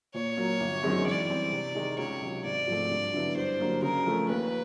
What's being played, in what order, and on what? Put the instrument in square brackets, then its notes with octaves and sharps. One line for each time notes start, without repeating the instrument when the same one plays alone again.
[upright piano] A#2 [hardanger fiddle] C#5
[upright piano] F#3 A#3
G1
F#2 D#3 G#3 C4
[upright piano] E3 [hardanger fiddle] D5
[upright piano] G3 C4
C3
D#3 G#3
[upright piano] C#2 [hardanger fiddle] C#5
[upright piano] C3 D#3 F#3
[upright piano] G#1 [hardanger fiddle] D5
[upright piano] G#2 F3 A3 C4
G2
D3 F#3 B3 E4
[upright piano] G2 [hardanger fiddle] C5
[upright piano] D3 F#3 A#3
[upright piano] C#3 [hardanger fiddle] A#4
[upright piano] F3 A3 C#4
[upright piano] D#2 [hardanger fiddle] B4